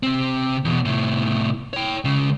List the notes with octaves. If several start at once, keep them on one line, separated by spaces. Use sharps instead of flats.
C3 C4
E2 B2
A2 C3
C#5 G5
C#2 C#3